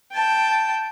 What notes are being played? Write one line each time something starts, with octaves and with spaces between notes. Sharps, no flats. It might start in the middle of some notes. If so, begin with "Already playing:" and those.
G5 A5